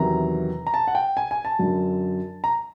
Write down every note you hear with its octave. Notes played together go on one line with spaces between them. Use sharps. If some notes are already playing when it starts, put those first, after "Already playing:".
Already playing: E2 C3 D#3 F#3 A#5
A#5
A5
F#5
G5
G#5
G#5
A5
F#2 D3 F#3
A#5